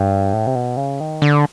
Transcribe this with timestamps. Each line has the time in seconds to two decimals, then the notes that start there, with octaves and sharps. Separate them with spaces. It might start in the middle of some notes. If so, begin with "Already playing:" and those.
Already playing: G2
0.33 A2
0.47 C3
0.55 B2
0.77 C#3
1.00 D#3
1.22 D3